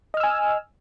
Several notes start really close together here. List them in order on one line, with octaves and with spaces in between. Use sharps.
D#5 F6 E6 G#5